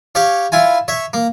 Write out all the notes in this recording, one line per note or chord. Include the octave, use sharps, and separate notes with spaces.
G4 C#5 F5
E4 F4 G#5
C#5 E5
A#3